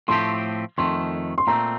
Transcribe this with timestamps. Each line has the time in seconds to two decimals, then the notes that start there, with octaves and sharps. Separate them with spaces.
0.08 A2 F3 A3 C4 G4 C6
0.78 F2 D#3 A3 C6
1.38 C6
1.47 A#2 A3 C4 A#5